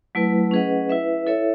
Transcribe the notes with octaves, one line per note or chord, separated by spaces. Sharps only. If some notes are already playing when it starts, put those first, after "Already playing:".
F#3 A3 E4 B4
C#4 G#4 B4 D#5 F#5
E4 B4 E5
E4 A4 C#5 E5